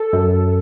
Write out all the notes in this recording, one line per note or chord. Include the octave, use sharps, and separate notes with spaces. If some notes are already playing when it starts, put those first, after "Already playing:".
Already playing: A4
F#2